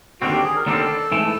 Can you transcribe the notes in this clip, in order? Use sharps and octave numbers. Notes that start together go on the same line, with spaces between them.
D#2 D3 G3 C4 F#4
G4
G#4
A#4
D#2 D3 G3 C4 A4
G#2 E3 A3